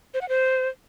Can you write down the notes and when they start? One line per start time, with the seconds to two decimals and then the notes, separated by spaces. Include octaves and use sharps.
0.14 C5
0.21 F#5
0.29 C5